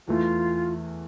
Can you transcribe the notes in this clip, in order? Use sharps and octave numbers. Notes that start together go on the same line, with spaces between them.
E2 E3 A3 F4